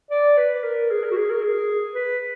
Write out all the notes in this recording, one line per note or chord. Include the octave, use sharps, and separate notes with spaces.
D5
B4
A#4
G#4
A#4
F#4
G#4
A#4
G#4
B4